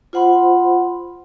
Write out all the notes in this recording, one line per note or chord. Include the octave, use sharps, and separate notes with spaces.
F4 C5 F#5 B5 C6